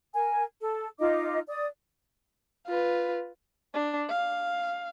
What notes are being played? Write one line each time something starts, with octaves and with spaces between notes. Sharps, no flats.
A#4 G#5
A4
D#4 F4 D#5 D6
D5 D#6
F4 B4
D4
F5